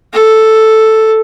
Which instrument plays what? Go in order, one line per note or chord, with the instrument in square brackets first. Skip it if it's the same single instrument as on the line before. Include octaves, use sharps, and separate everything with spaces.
[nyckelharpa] A4